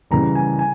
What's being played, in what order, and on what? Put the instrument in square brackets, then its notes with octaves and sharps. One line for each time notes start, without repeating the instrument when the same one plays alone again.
[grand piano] C#3 E3 G3 A#5
G#5
G#5